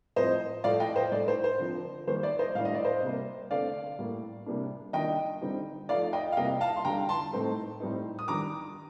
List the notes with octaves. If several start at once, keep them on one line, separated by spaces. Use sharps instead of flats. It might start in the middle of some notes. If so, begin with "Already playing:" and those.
A2 F3 C4 C5 D#5
A2 F3 A3 D5 F5
D#5 G5
C5 D#5
A2 A3 D#4 D5
C5
C5
D3 F3 C4
D#3 G3 A#3 C5
D5
C5 D#5
A2 G3 D4 F5
D#5
D5
C5 D#5
C3 G3 A#3
D3 A3 C4 D5 F5
A2 G3 A#3
C3 G3 A#3 D4
D#3 G3 A#3 D4 D#5 G5
D3 G3 C4 D#4
F3 A3 D#4 D5 F5
D#5 G5
F5
C3 G3 A#3 D#5 G5
F5 A5
C6
D3 G3 D4 G5 A#5
A5 C6
A2 A3 C4 D#4
A2 G3 C4 D#4
D#6
D#3 G3 D4 A#5 D6